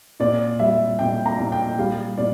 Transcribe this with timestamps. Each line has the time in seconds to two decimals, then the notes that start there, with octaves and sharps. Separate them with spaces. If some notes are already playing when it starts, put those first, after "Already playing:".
0.20 A#2 D5
0.59 G3 E5
0.99 A#2 G5
1.26 A#5
1.38 A#2
1.52 G5
1.78 G3 F5
2.18 A#2 D5